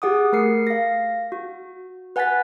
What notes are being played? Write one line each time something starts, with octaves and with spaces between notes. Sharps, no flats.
G4 G#4 F#5 D6 D#6
A3 A#4 C7 C#7
F5 A#6
F#4
B4 F#5 G#5 F#6 A6 B6